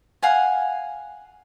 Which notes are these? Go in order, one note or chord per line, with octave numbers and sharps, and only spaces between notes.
F5 F#5 G#5